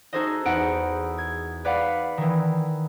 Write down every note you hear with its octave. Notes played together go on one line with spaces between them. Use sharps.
D#4 F#4 G#4 A4 C5 D#5
E2 D#4 F#5 D7
G#6
B4 D5 F5 F#5 B5
D#3 E3